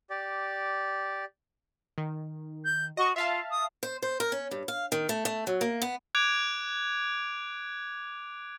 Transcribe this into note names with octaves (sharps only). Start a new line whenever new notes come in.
G4 D5
D#3
G6
F#4 D#5 C#6
F4 E5 F5 A5
D#6
C5
C5
A#4
C#4
G2
F5
D#3
A3
A3
F#3
A#3
B3
D6 F#6 G#6 D7 F7